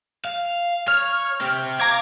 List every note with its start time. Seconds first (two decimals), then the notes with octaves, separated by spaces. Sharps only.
0.25 F5
0.88 C#5 F6
1.41 C4 G4
1.80 F5 A#5 D6 G#6